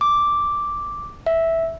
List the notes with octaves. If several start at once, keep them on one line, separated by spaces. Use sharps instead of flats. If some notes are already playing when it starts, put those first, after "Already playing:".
D6
E5